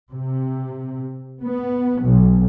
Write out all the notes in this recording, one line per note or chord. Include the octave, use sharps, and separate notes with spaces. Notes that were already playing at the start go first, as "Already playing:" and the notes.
C3
B3
B1